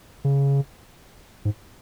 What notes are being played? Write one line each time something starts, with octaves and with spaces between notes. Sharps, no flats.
C#3
G#2